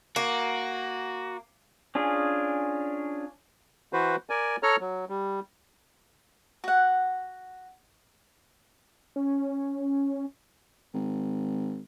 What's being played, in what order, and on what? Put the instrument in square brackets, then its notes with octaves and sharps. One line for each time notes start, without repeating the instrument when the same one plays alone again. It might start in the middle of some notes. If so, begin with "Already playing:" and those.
[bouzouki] A#3 [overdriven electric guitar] F#4
[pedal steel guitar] C#4 D4 F4 G#4
[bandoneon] E3 F#4 B4 C5
A#4 D5 G#5
A4 C#5 A#5 F6
F#3
G3
[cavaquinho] F#4 F#5
[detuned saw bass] C#4
[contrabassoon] G#1